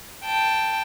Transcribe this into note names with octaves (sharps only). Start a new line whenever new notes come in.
G5 A5